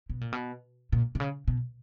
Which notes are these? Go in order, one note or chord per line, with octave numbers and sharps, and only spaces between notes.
B2
A#2
B2
A#2
C3
C#3
B2